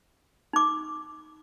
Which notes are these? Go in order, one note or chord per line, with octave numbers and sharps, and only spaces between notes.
D#4 D6